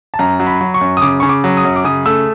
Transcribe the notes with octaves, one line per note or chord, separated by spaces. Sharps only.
A5
F#2 A#5
F#3
B5
F#3
C#6
F#2
D#6
C#3 D6
C#3 C#6
D6
F#3
D#6
F#2
D6
C#3 D#6
A3 E6